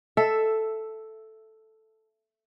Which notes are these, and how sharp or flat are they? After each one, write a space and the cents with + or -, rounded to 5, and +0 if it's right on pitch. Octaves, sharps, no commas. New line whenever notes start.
A4 +0 E5 +10